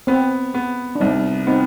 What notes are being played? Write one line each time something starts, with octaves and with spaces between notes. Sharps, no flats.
B3 C4
B3
D4
C2 C4 D#4
B3 C4 D#4